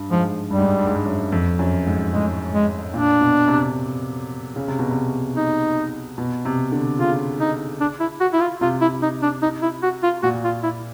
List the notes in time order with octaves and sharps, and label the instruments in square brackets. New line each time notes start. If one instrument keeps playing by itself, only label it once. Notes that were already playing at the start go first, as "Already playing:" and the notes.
Already playing: [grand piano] G2
[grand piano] G#2 [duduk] F3
[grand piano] G2 [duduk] G3
[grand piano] G#2
G2
G2
G#2
G2
F#2
F2
F#2
G#2
[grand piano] A2 [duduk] G#3
[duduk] G#3
[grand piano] A#2 [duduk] D4
[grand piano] B2
C3
C#3
C3
B2
C3
[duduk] D#4
[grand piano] B2
C3
D3
[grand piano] C#3 [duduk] F4
[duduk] D#4
D4
E4
F#4
E4
F4
[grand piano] C3 [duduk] F4
[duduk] E4
D#4
D4
D#4
E4
F#4
F4
[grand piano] A#2 [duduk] F#4
[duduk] F4
E4